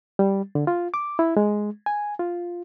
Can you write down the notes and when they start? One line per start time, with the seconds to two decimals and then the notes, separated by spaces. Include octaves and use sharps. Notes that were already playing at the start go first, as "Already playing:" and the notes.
0.19 G3
0.55 D3
0.67 F4
0.94 D6
1.19 E4
1.37 G#3
1.86 G#5
2.19 F4